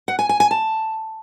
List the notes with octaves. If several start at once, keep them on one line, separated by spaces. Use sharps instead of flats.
F#5
G#5
G#5
G#5
A5